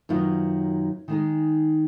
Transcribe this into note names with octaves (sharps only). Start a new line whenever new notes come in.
F#2 D#3 F#3 B3 F4
D#3 G#3 D#4 G#4